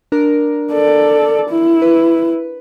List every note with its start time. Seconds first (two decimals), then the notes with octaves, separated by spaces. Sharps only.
0.12 D4 A#4
0.72 A4 D5
1.50 E4
1.82 B4